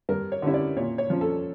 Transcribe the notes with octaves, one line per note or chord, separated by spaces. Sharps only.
G2 A#4
C#5
D3 G3 C#4 E4
D5
A#2 C#5
C#5
F3 C#4
A4